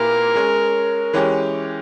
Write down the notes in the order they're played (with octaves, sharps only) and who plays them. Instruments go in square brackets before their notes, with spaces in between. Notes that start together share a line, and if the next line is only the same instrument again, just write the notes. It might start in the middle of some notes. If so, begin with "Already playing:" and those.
Already playing: [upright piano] A#2 A#3 E4 G4 B4 [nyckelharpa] A#4
[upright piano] G#3 C#4 G#4 C#5
E3 G#3 C#4 G4 C#5